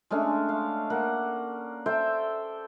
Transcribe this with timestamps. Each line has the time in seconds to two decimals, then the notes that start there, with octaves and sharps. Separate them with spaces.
0.10 G#3 A3 C#4 D4
0.49 F5
0.90 A#3 F#5
1.86 A4 C5 E5 G5